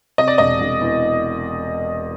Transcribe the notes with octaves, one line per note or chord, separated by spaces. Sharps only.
C3 D#5
D5
E1 D#5
E1
E2